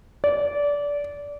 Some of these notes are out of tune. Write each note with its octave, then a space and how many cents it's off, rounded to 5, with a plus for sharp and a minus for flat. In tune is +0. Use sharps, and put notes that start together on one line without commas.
D5 -20